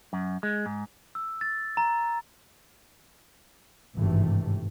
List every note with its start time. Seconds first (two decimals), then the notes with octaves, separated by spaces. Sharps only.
0.13 F#2
0.43 G#3
0.66 G#2
1.15 E6
1.41 A6
1.77 A#5
3.97 G#1 G2 C3 E3 A3